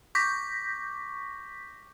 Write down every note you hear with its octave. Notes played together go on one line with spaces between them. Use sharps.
C#6 D6 G6 A#6 B6